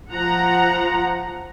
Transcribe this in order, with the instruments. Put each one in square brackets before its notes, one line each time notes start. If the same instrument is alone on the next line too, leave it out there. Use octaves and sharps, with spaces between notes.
[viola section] F3 F#5 A#5